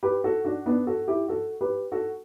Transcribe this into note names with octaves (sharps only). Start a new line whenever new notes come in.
G4 B4
F#4 A4
D4 F#4
B3 D4
F#4 A4
E4 G4
F#4 A4
G4 B4
F#4 A4